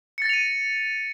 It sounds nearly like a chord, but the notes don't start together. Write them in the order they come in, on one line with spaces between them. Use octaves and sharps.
C#7 A6 A#6 F7 D#7